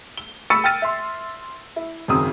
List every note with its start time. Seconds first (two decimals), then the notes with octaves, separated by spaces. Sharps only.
0.17 G7
0.50 B5 C#6 E6 A6 C#7 D#7
0.64 G5 F6 A6 D#7
0.82 E5 C6
1.76 E4
2.08 G#1 F#2 C#3 C4 D#6